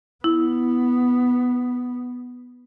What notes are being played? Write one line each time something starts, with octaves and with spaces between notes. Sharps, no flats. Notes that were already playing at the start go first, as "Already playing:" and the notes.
B3 E4